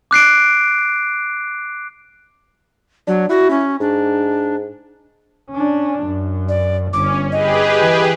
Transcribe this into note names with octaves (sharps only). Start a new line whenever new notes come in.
D6 F#6 C7 D7
F#3 D4
E4 F#4
C#4
G#2 D4
C#4 D4
F#2
D5
G1 C#4 D6
G4 G#4 B4 D#5
E3